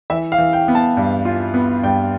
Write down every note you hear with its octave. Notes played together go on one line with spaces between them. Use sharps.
E3 E5
F5
E3
G5
B3
A5
G2
F4
B3
G2 G5